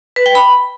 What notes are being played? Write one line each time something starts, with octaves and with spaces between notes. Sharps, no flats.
B4
G5
B5